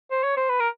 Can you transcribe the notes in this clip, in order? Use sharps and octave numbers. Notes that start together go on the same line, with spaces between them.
C5
C#5
C5
B4
A#4